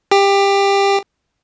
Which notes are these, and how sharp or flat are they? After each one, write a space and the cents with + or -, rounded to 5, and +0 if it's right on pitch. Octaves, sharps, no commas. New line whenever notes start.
G4 +20